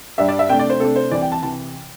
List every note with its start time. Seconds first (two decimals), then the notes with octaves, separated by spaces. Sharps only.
0.18 G2 G3 D4 E5
0.28 D5
0.39 E5
0.49 C3 A3 D4 G5
0.59 D5
0.70 C5
0.80 C3 A3 D4 A4
0.96 C5
1.11 C2 C3 E3 D5
1.22 G5
1.32 A5
1.43 C3 E3 A5